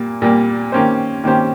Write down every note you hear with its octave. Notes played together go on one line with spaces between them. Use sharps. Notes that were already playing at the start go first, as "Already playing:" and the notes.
Already playing: A#2 G3 A#3
A#2 G3 A#3
D#3 A#3 C#4 G4 C5
D#3 A#3 C#4 G4 C5